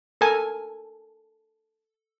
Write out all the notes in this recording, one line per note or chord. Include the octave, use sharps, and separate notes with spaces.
A4 A#4 G#5